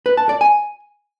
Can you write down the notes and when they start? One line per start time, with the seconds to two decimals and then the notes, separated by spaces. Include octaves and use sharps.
0.06 B4
0.17 A5
0.29 D5
0.41 G#5